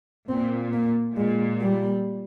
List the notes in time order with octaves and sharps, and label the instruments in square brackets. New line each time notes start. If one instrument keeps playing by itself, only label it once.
[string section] A#2 [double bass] C4
[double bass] A#3
[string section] A#2 [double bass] G#3
[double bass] G3